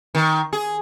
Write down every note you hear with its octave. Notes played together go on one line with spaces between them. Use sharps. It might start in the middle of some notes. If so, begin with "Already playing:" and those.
D#3
G#4